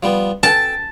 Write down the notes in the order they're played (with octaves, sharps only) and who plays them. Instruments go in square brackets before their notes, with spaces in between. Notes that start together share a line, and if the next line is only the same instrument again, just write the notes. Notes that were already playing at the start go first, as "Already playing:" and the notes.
[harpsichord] F3 G3 B3
[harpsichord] A4 G5 [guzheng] A5